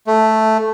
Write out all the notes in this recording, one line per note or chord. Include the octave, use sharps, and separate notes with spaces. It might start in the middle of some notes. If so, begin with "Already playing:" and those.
A3